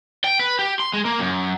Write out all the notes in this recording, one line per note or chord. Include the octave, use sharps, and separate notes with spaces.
G5
B4
G4
C6
G#3
A#3
F#2